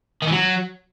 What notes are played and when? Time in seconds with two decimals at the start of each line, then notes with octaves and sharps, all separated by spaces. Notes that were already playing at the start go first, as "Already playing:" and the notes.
0.22 D#3
0.27 E3
0.32 F#3